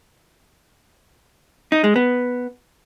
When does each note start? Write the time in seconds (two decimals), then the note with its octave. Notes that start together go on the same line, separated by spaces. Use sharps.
1.72 D#4
1.84 G#3
1.96 B3